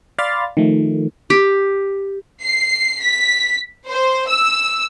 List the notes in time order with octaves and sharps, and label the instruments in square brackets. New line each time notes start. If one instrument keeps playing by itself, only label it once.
[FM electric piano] D5 F5 B5 C6 F6 A6
D#3 F3 A3
[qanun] G4
[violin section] C7
B6
C5
E6